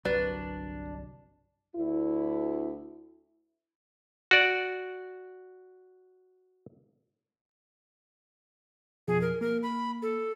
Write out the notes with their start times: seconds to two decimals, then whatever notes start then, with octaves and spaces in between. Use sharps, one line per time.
0.05 G1 C2 F#3 D4 B4
1.76 D2 E4
4.31 F#4 D5
9.08 F2 B2 F3 G#4
9.22 A#4
9.41 A#3 A#4
9.63 B5
10.02 A4